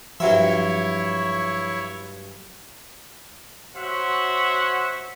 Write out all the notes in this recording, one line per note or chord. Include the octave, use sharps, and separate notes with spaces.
G2 F3 F#3 E4 C#5 E5
F#4 C5 C#5 E5 F#5